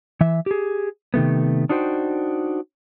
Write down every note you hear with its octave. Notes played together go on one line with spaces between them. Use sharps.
E3 E5
G4 G#4
C3 D#3 A3 B3
D4 D#4 F#4 C5 G5